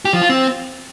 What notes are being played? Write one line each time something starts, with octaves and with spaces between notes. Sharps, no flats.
G4
F3
F4
C4